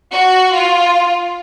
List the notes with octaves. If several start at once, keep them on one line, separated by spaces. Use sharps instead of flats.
F#4
F4